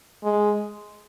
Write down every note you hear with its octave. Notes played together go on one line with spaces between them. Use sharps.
G#3